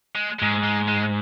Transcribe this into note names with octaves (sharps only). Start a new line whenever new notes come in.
G#3
G#2 G#3
G#3
G#3